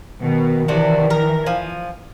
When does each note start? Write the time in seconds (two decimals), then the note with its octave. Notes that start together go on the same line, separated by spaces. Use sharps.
0.22 B2 D#3
0.68 C3 E3 D4 F#4
1.10 A#4
1.46 F3 G#5